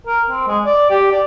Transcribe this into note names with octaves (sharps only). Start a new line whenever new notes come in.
A#4
C4
G#3
D5
G4
D5